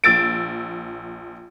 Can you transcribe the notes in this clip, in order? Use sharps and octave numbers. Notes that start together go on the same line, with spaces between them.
A#1 E6 A6 D7